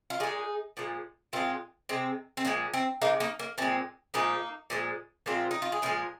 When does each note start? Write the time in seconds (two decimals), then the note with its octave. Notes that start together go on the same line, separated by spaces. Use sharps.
0.10 F4
0.20 A#2 G#3 D#4 G#4
0.77 A#2 F3 G#3
1.33 A#2 G#3 C4 F4
1.89 C3 G#3 C4
2.37 C4
2.45 A#2 F3 G#3 A#3
2.74 C4
3.02 C3 F3 G#3 A#3 D#4
3.20 A#3 D#4
3.39 A#3
3.58 A#2 G#3 C4
4.14 A#2 F3 G#3 A#3 D#4
4.70 A#2 F3 G#3
5.26 A#2 F3 G#3 C4 F4
5.51 D#4
5.62 F4
5.72 G#4
5.82 A#2 F3 G#3 F4 A#4